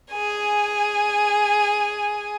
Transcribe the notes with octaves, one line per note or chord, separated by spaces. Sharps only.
G#4 G#5